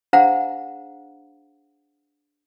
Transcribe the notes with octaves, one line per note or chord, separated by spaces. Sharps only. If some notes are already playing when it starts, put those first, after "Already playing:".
D4 G#4 C5 F5 F#5 A#5